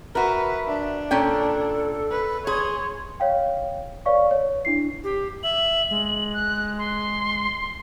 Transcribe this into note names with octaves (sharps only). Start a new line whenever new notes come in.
F#4 A#4 B4 E5
D4
A#2 C#4 A4 G5
B4
G#4 C#5 C6
C#5 F5 G5
B4 C#5 D5 F5 C#6
C#5
D4 E4 C7
G4
E5 F#7
G#3
F#6
C6